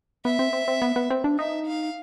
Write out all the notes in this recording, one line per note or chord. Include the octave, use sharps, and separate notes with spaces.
B3 E5
C4
C4
C4
B3
B3
C4
D4
D#4 E5
F5